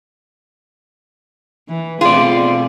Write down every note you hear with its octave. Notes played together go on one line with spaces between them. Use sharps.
E3
B2 A3 C4 F4 G#4 D5